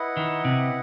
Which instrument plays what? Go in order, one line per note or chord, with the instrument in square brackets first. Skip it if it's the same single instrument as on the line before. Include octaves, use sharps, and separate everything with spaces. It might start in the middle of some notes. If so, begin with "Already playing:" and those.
Already playing: [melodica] E4 B4 D#5 F#5
[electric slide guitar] D#3
C3